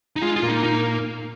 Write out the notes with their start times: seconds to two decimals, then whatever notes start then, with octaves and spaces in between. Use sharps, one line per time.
0.16 D#4
0.22 G#3 F4
0.36 F4
0.42 A#2 A#3
0.49 D#4
0.63 D#4